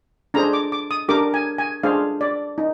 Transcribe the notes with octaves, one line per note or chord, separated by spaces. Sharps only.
D4 G#4 C5 A#5
D6
D6
D#6
D4 G4 A#4 D6
G#5
G#5
D4 G#4 C5 F5
D5
D#4